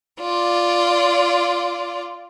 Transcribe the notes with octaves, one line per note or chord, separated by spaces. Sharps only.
F4 D5